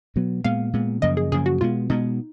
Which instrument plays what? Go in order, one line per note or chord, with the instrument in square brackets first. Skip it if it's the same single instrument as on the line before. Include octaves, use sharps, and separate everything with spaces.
[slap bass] B2 F#3 B3
[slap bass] A#2 G#3 B3 [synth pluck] F5
[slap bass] A#2 G#3 B3
[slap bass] F#2 C#3 F3 A#3 [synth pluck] D#5
[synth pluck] G#4
[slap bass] F#2 C#3 F3 A#3 [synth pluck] G#4
[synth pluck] F#4
[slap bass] B2 G#3 B3 [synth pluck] F4
[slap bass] B2 G#3 B3 [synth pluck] D#4